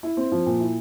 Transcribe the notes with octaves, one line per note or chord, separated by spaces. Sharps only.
E4
C4
F3
A#2
E4